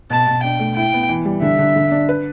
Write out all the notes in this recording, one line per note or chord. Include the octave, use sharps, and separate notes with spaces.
B2 A5
B2
D4 G5
A3
E4 G5
B3
E3
G3
D3 E5
D3
D3
D4
B4